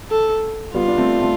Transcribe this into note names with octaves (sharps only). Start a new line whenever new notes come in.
A4
G3 B3 F4
D4
A3 C4
A3 C4